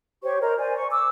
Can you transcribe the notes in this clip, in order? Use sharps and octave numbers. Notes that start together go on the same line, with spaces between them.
G4 C5 C#5 C#6
A#4 C5 D#5 A#5
C5 D5 G#5
C#6
D6 E6